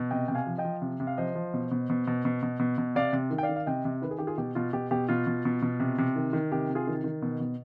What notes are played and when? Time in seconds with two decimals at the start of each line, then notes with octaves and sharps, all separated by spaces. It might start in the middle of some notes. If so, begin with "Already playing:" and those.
Already playing: B2
0.11 C3 D#5 G5
0.28 C3 G5
0.34 F5 G#5
0.47 F3
0.58 D#5 G5
0.65 F3
0.82 C3
1.00 C3
1.07 F5
1.18 F3 C5 D#5
1.35 F3
1.54 B2
1.71 B2
1.89 B2
2.07 B2
2.25 B2
2.42 B2
2.59 B2
2.78 B2
2.95 C3 D5 F5
3.13 C3
3.31 D#3
3.38 G5
3.43 D5 F5
3.49 D#3
3.56 F5
3.66 C3 D#5 G5
3.85 C3
4.02 D#3 B4
4.11 G#4
4.18 D#3 G4
4.27 F4 G#4
4.38 B2 G4
4.55 B2 F4
4.73 B2 G4
4.91 B2 G4
5.09 B2 F4
5.27 B2
5.45 B2
5.62 B2
5.80 C3
5.98 C3
6.16 D#3
6.33 D#3
6.52 C3 G4
6.69 C3
6.75 F4 G#4
6.87 D#3
7.04 D#3
7.22 B2
7.40 B2